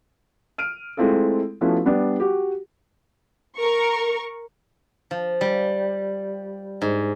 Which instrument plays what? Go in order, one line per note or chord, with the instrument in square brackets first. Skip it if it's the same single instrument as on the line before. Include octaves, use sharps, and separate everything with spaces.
[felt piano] F6 D7 D#7
G#3 A3 C4 E4 F4 A4
F3 A3 B3 C#4 E4 F#4
G3 B3 D4
F#4 G4
[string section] A#4 C#6
[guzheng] F3
G3
G#2